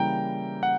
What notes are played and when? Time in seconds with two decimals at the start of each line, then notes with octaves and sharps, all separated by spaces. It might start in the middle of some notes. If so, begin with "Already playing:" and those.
Already playing: C#3 E3 G3 A#3 E4 G5 A#5
0.63 F#5